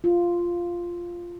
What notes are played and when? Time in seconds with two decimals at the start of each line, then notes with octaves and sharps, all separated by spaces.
0.04 F4